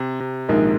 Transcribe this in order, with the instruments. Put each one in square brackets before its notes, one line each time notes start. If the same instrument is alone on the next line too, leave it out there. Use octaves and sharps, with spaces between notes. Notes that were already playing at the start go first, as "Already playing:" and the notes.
Already playing: [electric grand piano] C3
C3
[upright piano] A#1 G#2 D#3 A#3 D#4 [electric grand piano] G#3